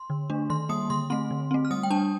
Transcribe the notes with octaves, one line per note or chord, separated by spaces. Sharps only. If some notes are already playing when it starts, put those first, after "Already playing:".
Already playing: C6
D3
A3 D4
D#3 C6
G3 A#3 D#6
D3 C6
A3 C4 C6
D3
A3 C4
F6
G3 D#6
G5
D4 A5